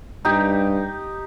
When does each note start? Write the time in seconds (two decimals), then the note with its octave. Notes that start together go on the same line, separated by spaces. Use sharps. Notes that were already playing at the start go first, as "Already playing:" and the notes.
0.25 G2 D#4 G4